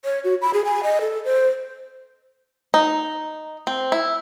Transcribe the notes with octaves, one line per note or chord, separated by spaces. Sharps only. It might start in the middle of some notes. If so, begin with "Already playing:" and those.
C#5
F#4
B5
G#4
G#5
D#5
A4
C5
D#4
C4
E4